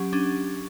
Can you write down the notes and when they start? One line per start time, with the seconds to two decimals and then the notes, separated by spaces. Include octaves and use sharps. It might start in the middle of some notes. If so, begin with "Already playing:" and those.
Already playing: F#3 C#4 G4
0.13 C#4 D4